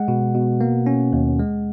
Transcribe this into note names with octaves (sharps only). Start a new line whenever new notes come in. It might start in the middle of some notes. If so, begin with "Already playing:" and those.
Already playing: G#3 F#5
B2
B2
A#3
C#4
D#2
G#3